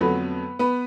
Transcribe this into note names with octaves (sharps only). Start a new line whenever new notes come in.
F2 D3 F#3 A3 B3 B4
B3 B4